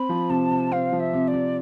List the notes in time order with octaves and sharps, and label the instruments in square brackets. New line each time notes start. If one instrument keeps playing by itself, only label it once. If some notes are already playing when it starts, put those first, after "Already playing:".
Already playing: [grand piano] C4 [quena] B5
[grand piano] F3
[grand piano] C3 [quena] A5
[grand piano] C3
[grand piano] C4 [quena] F5
[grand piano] F3
[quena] E5
[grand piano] C3
[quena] D5
[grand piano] C3